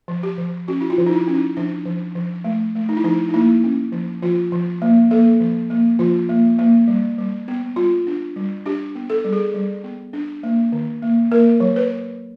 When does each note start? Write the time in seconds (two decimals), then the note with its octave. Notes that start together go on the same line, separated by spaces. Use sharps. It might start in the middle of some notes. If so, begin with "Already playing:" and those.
0.08 F3
0.23 G4
0.38 F3
0.68 C#4 F#4
0.81 E4
0.90 F4
0.98 F3
1.07 D#4
1.13 E4
1.28 C#4
1.34 D#4
1.57 F3 D4
1.86 F3
2.15 F3
2.44 A3
2.75 A3
2.89 D#4
2.97 E4
3.04 F3 D#4
3.29 D#4
3.34 A#3 E4
3.64 C#4
3.92 F3
4.23 F3 F4
4.52 F3
4.82 A#3
5.11 A#3 A4
5.40 F3
5.70 A#3
5.99 F3 F4
6.29 A#3
6.59 A#3
6.88 G3
7.18 G3
7.48 B3
7.76 G3 F4
8.07 D4
8.36 G3
8.66 D4 G4
8.95 B3
9.10 A4
9.25 G3
9.33 G#4
9.54 G3
9.84 B3
10.13 D4
10.43 A#3
10.72 D#3
11.02 A#3
11.31 A#3 A#4
11.60 F#3
11.76 B4